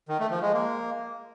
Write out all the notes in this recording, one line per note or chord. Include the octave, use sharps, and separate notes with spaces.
D#3
A3
F3
G#3
A#3